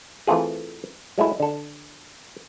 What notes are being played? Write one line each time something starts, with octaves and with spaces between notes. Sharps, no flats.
E3 A3 C4 F4 G#4
F#3 G#3 A3 E4
D3 A4